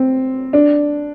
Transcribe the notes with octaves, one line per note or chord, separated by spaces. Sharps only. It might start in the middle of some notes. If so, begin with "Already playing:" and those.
Already playing: C4
D4